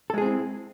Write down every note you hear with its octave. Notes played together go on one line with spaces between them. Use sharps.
G#3 C4 E4 G#4 A4